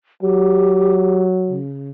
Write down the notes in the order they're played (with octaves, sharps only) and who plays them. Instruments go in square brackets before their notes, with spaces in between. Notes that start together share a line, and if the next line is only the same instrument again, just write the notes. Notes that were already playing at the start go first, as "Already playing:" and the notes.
[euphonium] F#3 [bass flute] G4
[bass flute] C#3